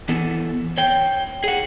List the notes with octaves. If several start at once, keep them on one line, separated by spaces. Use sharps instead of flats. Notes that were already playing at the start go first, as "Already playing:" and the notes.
E3 B3 A4
C#5 G5
G#4 F#5